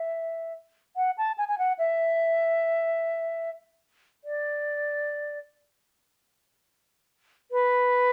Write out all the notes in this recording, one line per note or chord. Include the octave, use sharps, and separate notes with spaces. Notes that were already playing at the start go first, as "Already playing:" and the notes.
Already playing: E5
F#5
A5
G#5
G#5
F#5
E5
D5
B4